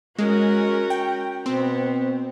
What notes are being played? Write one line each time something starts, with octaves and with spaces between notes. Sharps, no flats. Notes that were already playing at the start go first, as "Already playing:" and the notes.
G#3 C#4 F#4 A#4
G5
B2 B3 C4